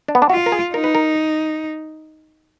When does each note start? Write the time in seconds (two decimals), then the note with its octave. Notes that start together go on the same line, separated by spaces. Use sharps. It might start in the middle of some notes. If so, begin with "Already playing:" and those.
0.08 D4
0.15 B3
0.22 D4
0.30 F4 F#4
0.46 A#4
0.52 G#4
0.74 D#4 A#4
0.84 B4
0.95 A#4